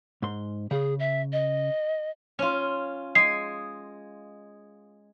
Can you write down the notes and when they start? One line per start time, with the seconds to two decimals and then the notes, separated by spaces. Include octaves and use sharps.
0.22 G#2 C6
0.71 C#3 G#4
0.99 E5
1.32 D#5
2.39 C#4 F4
3.15 G#3 G#4 C7